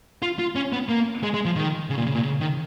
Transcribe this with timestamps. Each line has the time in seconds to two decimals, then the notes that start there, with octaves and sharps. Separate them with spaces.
0.22 F4
0.39 F4
0.55 C#4
0.72 B3
0.89 A#3
1.23 G#3
1.34 G#3
1.45 F3
1.56 D#3
1.90 C#3
1.98 A#2
2.07 C#3
2.15 A#2
2.23 C#3
2.40 D#3